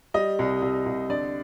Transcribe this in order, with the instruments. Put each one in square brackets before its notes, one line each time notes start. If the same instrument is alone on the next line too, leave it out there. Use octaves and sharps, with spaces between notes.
[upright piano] G3 D#5
C2
C2
C2
D3 D5